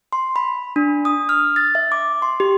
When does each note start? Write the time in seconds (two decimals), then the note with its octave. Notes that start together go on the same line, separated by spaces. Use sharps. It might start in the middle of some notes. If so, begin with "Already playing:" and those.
0.13 C6
0.36 B5
0.76 D4
1.05 D#6
1.29 F6
1.56 A6
1.75 E5
1.92 D6
2.22 C6
2.40 G4